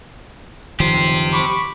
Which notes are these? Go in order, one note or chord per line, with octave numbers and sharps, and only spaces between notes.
F#1 D#3 F3 G4 C5
B5 C#6 D6